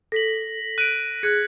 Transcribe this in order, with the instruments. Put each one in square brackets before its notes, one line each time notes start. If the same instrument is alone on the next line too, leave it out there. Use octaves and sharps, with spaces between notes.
[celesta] A4 [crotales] A#6 B6 F#7
[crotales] F#6 [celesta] D7 D#7
[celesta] G#4 F#6 [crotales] G#6 C#7